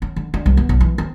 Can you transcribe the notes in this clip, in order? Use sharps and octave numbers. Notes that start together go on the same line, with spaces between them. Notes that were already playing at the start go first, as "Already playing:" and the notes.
C#4
D3
D4
C2
B3
B1
E3
C4